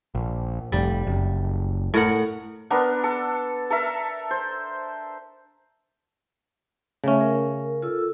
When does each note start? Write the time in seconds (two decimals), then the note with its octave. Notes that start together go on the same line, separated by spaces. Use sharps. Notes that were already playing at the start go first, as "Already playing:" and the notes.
0.15 A#1
0.72 F1 G3
1.07 F#1
1.94 A2 A#4 F#5
2.70 B3 D4 A#4
3.04 A4
3.70 A4 A#4 E5
4.31 C5
7.04 C#3 A3 C#4 E5
7.21 A#4
7.82 F4 A4 E6